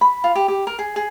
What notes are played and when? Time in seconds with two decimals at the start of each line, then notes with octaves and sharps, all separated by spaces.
0.01 B5
0.24 F4
0.35 G4
0.48 G4
0.67 A#4
0.79 G#4
0.96 G#4